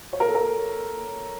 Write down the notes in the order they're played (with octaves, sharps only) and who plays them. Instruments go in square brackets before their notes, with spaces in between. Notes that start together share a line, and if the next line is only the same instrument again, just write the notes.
[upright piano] C#5
A#4
A4
A#4